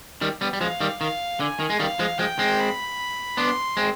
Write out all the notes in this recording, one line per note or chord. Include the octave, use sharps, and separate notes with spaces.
D#3 G3
G3 B3
G3
F3 G#3 F5
D#3 G3
D#3 F5
D3 G#5
D#3
G#3
D#3 G3 F5
F3 G#3
F3 G#3 G5
G#3 C4
B5
B3 D4 C6
G#3 C4